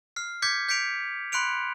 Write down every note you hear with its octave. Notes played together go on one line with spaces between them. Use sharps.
F6 C7
D6 G6 G#6 B6 C#7
G6 B6 C#7 D7 F7
B5 C6 F#6 C#7 D7 F7